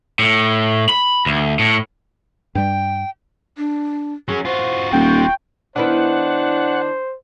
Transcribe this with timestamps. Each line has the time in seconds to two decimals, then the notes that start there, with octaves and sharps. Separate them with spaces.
0.19 A2
0.89 B5
1.26 D2
1.59 A2
2.55 G2 G3 G5
3.58 D4
4.29 F#3 C#4 G#4
4.45 F4 F#4 C5
4.92 D#1 G5 C#6
5.76 D#3 B3 D4 E4 C5 F#5